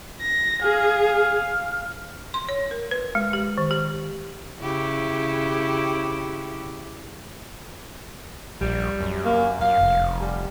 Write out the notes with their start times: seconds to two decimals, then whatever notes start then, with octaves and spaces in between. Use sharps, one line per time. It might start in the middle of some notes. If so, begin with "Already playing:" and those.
0.21 A#6
0.62 G#4 F5
2.34 C6
2.49 C#5
2.71 A#4
2.91 B4
3.15 G#3
3.33 G4
3.58 D#3
3.71 G4
4.59 C#3 E4 G4
8.61 A#1 G3
9.01 F#2
9.25 A#3
9.61 F#2 F5
9.81 F1
10.21 G3